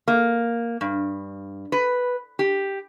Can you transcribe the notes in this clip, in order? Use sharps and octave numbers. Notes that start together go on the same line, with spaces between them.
A#3
G2
B4
G4